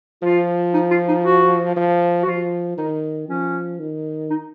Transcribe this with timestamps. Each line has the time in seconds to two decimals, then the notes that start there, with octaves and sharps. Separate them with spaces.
0.22 F3 F4
0.74 D#4
0.91 F4
1.08 D#4
1.24 F#4
1.76 F3
2.23 F#4
2.26 F3 F4
2.78 D#3 D#4
3.28 F3 C#4
3.79 D#3
4.30 D#4